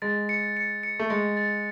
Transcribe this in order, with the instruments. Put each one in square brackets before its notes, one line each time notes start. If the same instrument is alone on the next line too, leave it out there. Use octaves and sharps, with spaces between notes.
[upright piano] G#3 [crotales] A6
[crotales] C#7
C#7
C#7
[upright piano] A3
[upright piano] G#3 [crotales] C#7
[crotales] A6